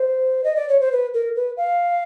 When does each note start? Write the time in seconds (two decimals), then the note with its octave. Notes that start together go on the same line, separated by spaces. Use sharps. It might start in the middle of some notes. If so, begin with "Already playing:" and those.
Already playing: C5
0.44 D#5
0.56 D5
0.69 C#5
0.80 C5
0.92 B4
1.14 A#4
1.36 B4
1.57 F5